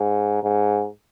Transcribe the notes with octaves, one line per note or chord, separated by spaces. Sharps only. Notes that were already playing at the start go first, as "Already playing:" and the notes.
Already playing: G#2
G#2